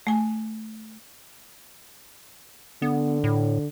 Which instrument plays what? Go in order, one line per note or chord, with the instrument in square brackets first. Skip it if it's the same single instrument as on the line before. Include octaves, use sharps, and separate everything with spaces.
[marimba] A3 G#5
[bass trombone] D3 [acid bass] B3
[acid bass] A2